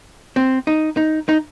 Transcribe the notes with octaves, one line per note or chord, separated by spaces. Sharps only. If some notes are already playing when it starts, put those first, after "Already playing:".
C4
D#4
D#4
D#4